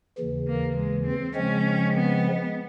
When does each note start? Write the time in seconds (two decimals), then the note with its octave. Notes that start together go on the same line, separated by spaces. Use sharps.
0.18 D#2 C#3 E3
0.47 A#3
0.76 G#3
1.05 C4
1.34 C#3 F3 G#3 C4 C#4
1.94 B3